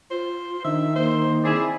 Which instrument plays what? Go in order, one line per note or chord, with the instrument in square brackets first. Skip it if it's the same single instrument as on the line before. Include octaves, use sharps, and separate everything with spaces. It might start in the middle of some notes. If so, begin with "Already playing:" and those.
[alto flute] F4 [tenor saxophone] C5
[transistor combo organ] D#3 [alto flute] D4 [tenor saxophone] E5
[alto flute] A#3 [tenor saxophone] C5
[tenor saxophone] C4 [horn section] E4 G#4 D5